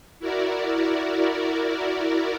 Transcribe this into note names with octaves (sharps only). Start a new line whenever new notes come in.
E4 F#4 A#4 D5